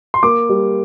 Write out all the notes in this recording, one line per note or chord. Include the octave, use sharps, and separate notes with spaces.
C6
A#3 D6
G3